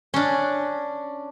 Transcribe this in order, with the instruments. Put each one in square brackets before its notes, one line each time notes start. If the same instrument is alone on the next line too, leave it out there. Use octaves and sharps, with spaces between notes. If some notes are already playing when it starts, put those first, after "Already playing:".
[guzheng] C#4 D4